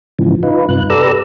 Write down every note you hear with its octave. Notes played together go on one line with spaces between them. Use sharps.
G#2 C#3 E3 F3
D#4 F4 B4
G2 C3 F#6
G4 A4 B4 D5 A#5 E6